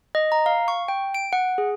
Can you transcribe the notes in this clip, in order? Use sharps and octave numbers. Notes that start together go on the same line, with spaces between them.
D#5
A#5
F5
C#6
G5
D7
F#5
G#4